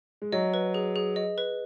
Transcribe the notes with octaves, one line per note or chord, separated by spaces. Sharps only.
G#3
F#3 D#5
B4
G#4
G#4
D#5
B4